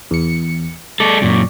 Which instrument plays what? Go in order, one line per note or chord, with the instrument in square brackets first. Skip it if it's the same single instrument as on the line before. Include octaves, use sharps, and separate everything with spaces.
[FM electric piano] E2 C#7
[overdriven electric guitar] G#3 A4 [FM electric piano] D5 C#6 D6
[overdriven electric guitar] F#2 A#2